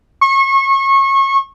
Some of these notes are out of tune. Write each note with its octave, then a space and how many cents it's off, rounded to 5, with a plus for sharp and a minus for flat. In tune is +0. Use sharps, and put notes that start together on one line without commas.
C#6 -30